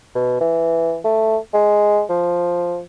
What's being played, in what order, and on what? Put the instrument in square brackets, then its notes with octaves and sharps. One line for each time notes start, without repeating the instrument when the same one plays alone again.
[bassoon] B2
E3
A3
G#3
F3